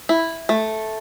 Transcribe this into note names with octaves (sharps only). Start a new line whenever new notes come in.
E4
A3